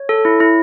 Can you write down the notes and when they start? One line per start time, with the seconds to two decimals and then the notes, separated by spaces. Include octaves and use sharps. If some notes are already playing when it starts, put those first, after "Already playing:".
Already playing: C#5
0.09 A4
0.25 E4
0.40 E4